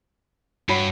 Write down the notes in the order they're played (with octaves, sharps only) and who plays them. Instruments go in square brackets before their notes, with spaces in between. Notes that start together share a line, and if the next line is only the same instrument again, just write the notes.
[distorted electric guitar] G2 [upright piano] F#4 C#5 B5